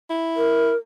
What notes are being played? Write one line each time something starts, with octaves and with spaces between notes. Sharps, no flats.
E4
A#4